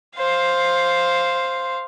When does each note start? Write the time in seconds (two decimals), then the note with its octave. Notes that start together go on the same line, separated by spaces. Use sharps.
0.18 C5 F5